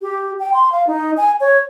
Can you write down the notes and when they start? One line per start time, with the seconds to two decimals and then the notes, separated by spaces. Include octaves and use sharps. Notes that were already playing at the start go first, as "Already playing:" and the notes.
0.02 G4
0.39 G5
0.54 C6
0.72 F5
0.87 D#4
1.17 G#5
1.40 C#5